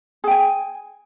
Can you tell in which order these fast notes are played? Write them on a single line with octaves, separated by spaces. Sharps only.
G#4 G5 G#5